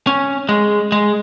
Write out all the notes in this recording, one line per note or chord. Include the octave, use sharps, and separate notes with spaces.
C#4
G#3
G#3